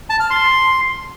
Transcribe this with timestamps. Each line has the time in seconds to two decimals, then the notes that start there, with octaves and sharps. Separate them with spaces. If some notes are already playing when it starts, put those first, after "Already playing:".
0.10 A5
0.20 F6
0.30 C6